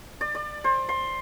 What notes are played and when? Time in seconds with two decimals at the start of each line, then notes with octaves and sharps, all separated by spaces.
0.21 D5
0.35 D5
0.64 C5
0.89 C6